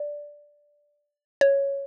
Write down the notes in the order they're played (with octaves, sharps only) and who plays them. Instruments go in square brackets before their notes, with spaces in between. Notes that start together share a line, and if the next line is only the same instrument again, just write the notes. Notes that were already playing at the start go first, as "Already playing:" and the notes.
Already playing: [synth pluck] D5
C#5